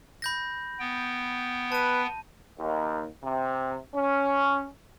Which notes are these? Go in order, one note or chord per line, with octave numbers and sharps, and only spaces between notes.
B5 G6 A#6
B3 G5
B4 A5 D#7
D#2
C3
C#4